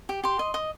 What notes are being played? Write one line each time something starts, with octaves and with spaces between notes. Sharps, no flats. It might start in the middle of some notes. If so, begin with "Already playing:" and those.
G4
G4 C6
D#5
D#5